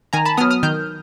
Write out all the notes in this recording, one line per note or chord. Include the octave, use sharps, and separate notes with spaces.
D#3 G#5 A#5
A5 B5
F#3 B3 D#6 F6
D#6 F6
D#3 F6 G6